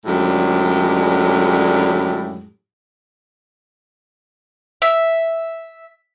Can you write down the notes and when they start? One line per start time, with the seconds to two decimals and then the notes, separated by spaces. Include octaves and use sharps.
0.06 F#2 A2 D3 F3 G3 G#3
4.82 E5